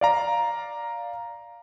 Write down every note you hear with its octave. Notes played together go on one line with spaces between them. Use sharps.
D5 F5 A#5